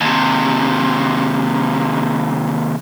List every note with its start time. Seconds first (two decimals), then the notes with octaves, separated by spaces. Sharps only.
0.01 D#2 C3